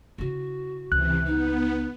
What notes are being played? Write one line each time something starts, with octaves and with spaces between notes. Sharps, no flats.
C#3 E4 F#4
C#2 C3 E3 F#6
B3 D#4